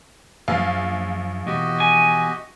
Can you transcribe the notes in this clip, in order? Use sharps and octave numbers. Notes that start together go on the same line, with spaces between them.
A#1 F#2 F5
B2 E3 F#4 G4 D#5
G#5